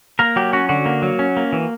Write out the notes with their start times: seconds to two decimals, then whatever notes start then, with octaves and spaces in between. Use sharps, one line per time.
0.19 A#3 A#4
0.36 F#3 G4
0.53 C#4 F#4
0.69 D3 F#4
0.86 A#3
1.02 F#3
1.19 C#4
1.37 A#3
1.53 E3